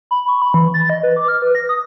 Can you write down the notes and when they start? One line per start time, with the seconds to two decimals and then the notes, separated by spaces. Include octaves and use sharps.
0.11 B5
0.28 C#6
0.42 B5
0.54 E3
0.74 A6
0.90 D#5
1.03 B4
1.16 D6
1.28 F6
1.42 B4
1.55 A#6
1.69 D#6